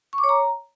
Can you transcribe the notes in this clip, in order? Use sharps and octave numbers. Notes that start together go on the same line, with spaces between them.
C#6
D6
C#5
A#5